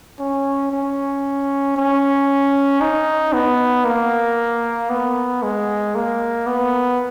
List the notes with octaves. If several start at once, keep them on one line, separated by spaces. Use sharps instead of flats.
C#4
C#4
C#4
D#4
B3
A#3
B3
G#3
A#3
B3